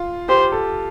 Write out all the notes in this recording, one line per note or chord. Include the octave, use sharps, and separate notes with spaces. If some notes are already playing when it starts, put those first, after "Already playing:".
Already playing: F4
G4 C5
A4